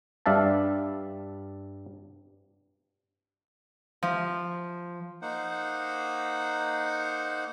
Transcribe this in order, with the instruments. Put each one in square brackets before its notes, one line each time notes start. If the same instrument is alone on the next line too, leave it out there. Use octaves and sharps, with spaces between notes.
[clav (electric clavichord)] G2 G3 D4 E5 F5 A5
[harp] F3
[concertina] A#3 D#4 C5 F#5